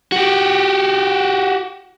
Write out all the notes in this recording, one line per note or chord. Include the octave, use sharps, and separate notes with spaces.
F#4 G4